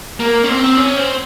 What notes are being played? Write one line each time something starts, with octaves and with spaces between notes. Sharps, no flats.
A#3
C#4
C4
C#4
C4